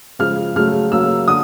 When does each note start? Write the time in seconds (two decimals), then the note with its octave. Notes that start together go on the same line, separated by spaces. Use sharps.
0.19 C#3 F3 G#3 F6
0.55 C#3 F#3 A3 F6
0.92 C#3 F#3 A#3 E6
1.28 D3 D#6